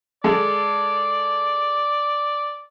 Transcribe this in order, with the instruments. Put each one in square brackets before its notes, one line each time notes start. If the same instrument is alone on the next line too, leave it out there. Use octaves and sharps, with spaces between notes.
[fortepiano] G#3 A4 [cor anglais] D5